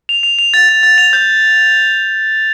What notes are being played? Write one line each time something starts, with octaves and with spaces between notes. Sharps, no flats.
F7
F7
F7
A6
A6
A6
F7
G6